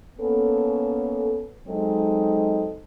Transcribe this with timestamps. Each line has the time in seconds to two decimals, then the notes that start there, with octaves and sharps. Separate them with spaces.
0.19 A#3 B3 C#4 A4
1.68 F#3 G#3 C4 D#4 A4 D#5